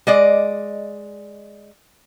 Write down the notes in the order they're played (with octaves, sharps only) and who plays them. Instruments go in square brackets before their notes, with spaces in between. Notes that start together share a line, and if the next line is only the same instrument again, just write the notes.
[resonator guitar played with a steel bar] G#3 D5 D#5